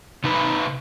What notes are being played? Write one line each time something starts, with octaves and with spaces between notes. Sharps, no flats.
C3 D#4 B4